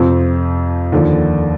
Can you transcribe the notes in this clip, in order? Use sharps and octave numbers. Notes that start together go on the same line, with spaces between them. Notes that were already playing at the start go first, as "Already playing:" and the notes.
Already playing: F2 C3 F3 C4
D#2 D3 F3